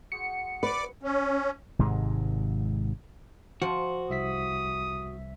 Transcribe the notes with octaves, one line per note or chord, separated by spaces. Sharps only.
F#4 G#4 C5 C#7
B4 D5 D6
C#4
G#1 G#2 C3 G#3
F3 F#4
C2 E5 D#6 B6